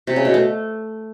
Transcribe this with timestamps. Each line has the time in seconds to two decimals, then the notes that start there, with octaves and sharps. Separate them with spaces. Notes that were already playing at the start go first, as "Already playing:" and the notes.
0.07 C3
0.16 C#3
0.25 B2
0.34 A3